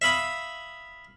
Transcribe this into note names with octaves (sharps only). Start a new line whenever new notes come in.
E5 F5 B5 D#6